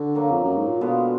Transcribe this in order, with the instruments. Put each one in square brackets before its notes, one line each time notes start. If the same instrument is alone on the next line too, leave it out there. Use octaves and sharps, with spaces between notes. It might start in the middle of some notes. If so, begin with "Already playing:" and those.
Already playing: [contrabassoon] D3 [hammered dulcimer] F#4
[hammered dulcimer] D#3 F#3 A#3
[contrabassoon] F2
F#2
G#2
A#2
[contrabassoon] B2 [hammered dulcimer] D3 G#3 B3 F4